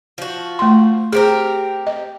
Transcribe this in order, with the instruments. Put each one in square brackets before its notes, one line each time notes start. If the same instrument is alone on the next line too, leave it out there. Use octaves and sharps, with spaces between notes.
[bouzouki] F3 F#4
[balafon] A3 C6
[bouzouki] C4 G4 A#4 [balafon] G#4 C5
[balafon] D#5